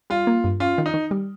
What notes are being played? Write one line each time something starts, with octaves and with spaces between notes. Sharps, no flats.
G3 F4
A#3
G2
C#4 F4
D#3
D#4
D#3
G3